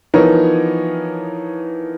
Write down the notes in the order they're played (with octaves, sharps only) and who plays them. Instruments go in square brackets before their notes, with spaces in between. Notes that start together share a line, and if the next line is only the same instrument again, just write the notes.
[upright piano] E3 F3 B3 D#4 A#4 C#5